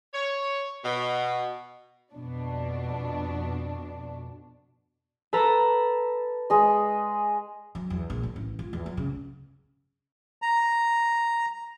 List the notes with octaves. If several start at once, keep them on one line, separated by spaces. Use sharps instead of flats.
C#5
B2
F2 B2 D4
A4 B4 A5 A#5
G#3 D#5
F#3
E2
A#1
D3
A1
F4
E2
F#3
C#3
A#5